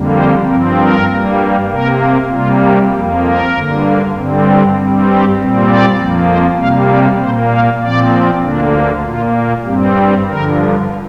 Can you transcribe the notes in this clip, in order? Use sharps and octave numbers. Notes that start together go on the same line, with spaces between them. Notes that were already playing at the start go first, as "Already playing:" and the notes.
Already playing: F2 D3 G3 A#3
C5
G2 F3 C4 A#4
A#4
G2 G3 A#3
C3 A#3 A#4
C3 G3 A#3 F4
F2 F3 A#3 G4
A#4
G2 D3 A#3
G2 D3 G3 C4
G4
G2 G3 C4
G4
A#2 G3 C4
D5
F2 F3 A#3
C5
C3 G3 A#3 F5
D5
A#2 A#3 C5
F5
A#2 F3 C4 D5
D2 D3 A#3 D4
A#2 A#3 F4
G2 G3 C4 G4
G4
G2 D3 F3 A#4